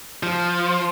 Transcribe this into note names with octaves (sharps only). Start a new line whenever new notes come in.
F3